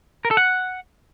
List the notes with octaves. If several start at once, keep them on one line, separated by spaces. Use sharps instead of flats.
A#4
A4
F#5